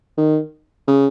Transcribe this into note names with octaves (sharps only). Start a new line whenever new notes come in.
D#3
C#3